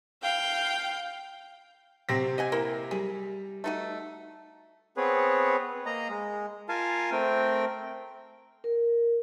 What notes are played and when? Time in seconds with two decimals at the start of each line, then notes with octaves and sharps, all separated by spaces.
0.22 F5 G5
2.09 C3 F#3 C4 A#6
2.38 D#5 F#5 G#5
2.52 A#3 E4
2.91 G3 G#4
3.64 A3 D#4 F#4
4.97 B3 C4 G#4 B4 C#5
5.86 A#3 D#5 A#5
6.09 G#3
6.69 F4 A#4 F5 G#5 A5
7.12 A3 C4 A#4 G5
8.64 A#4